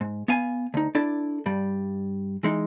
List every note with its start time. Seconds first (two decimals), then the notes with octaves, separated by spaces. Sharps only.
0.01 G#2
0.28 B3 F5 G#5
0.74 D2 D#4
0.95 D4 E4 A4 D5
1.46 G2 G3
2.43 E3 G#3 D#4